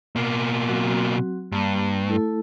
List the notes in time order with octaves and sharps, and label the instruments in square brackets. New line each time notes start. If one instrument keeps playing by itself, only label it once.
[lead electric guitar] B2 A#3
[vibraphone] F#3 C4 F#4
[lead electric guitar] G2 [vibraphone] A#3
[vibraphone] A3 E4 A4